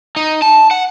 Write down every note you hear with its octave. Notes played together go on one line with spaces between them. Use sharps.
D#4
A5
F#5